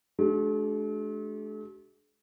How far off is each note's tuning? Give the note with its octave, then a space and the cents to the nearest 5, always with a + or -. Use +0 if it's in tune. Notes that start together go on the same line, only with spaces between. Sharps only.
A3 -45 D4 +0 F#4 +45